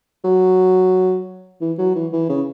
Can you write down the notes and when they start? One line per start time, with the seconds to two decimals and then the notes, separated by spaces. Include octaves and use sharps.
0.24 F#3
1.61 E3
1.78 F#3
1.95 E3
2.13 E3
2.29 C#3